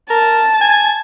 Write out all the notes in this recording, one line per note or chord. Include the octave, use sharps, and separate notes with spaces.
A#4 A5
G#5